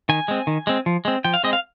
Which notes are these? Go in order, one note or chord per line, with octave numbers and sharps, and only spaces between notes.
D#3 G#5
G#3 C4
D#3
G#3 C4
F3
G#3 C4
F3 G5
F5
G#3 C4 D#5
F5